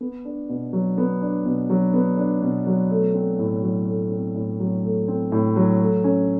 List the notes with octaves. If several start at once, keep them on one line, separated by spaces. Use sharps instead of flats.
B3
D4
B2
F#3
B3
D4
B2
F#3
B3
D4
B2
F#3
A3
C4
A2
F#3
A3
C4
A2
F#3
A3
C4
A2
F#3
A3
C#4